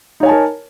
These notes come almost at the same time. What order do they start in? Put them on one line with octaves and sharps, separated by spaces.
D#4 C#5 G#5 A5 A#4